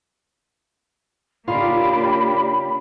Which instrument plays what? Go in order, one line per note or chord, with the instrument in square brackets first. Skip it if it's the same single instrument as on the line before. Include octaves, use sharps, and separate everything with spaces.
[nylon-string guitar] C#3 D#4 F4 [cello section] A#3 D4 G4 [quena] B5